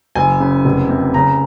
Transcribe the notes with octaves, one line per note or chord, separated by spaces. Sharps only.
F#1 G#5
C#3
F1
C3
C#3 A#5